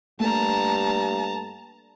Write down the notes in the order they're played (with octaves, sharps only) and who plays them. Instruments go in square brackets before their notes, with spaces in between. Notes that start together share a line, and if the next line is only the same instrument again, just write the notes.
[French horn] G2 [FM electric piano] A3 A#3 A4 [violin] A5 A#5